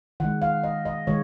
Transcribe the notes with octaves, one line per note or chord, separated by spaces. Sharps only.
D#3 G#3 F#5
F5
D#5
D#5
D#3 G#3 C#5